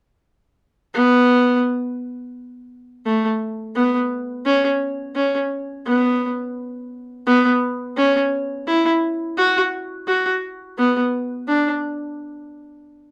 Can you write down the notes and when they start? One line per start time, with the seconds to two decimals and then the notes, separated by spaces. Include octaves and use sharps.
0.94 B3
3.06 A3
3.75 B3
4.46 C#4
5.15 C#4
5.86 B3
7.27 B3
7.97 C#4
8.67 E4
9.38 F#4
10.08 F#4
10.78 B3
11.48 D4